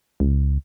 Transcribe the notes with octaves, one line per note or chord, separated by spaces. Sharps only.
C#2